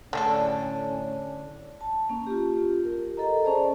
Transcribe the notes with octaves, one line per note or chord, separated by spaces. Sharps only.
A2 D3 A3 C#4 G#4 A4 C#5
A5
A#3 C#4
F4 G4
A#4
A4 D#5 A#5
C#4 G#4 C5 D5 A5